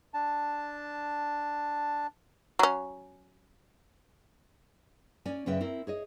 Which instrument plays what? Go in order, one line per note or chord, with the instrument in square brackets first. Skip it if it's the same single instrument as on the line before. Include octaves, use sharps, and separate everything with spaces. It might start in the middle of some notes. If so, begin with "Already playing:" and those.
[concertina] D4 A5
[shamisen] F#3 C#4
[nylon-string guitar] C#4 D5 G#5
F#2 C#3 C#4 B4 E5 G5
C4 E4 A#4
G#4 C#5 D#5